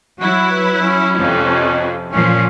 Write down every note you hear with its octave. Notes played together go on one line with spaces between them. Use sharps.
F#3 E4 F#4
B4
C#4
F2 C3
A#2 F3 C#4